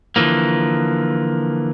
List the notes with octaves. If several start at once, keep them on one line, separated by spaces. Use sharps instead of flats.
D3 E3 F3 A#3